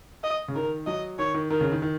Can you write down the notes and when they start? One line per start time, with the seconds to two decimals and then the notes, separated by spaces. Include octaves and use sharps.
0.24 D#5
0.48 C#3
0.55 D#3 A#4
0.87 F#3 D#5
1.19 D#3 C#5
1.34 D#3
1.50 D#3 A#4
1.61 C#3
1.72 D#3
1.82 D#3